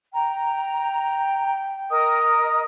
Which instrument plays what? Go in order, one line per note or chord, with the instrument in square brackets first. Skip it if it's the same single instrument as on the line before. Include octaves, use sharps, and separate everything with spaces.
[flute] G5 [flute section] A#5
[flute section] A#4 D#5 [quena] D#6